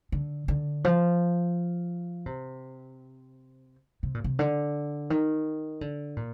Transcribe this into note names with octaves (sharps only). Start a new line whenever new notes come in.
D3
D3
F3
C3
C3
A#2
C3
D3
D#3
D3
A#2